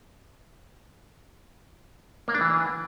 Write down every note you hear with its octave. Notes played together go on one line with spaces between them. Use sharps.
A#3
D4
E3